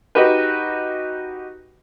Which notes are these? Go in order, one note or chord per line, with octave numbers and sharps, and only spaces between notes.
D#4 F#4 G4 B4